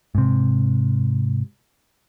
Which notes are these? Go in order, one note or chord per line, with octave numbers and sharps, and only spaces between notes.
G#2 C3